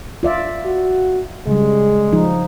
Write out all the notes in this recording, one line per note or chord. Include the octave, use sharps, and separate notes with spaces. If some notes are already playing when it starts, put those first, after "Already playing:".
F4 D5 E5
F#4
C#3 G3 G#3
F3 D#4